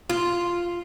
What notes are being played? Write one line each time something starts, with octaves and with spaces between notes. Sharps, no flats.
F4